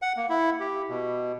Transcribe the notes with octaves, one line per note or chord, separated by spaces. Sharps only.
F#5
A#3
E4
G4
B2